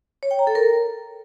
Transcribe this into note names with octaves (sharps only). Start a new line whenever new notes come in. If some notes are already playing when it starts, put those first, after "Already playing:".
C#5
G5
A#5
A4
A#4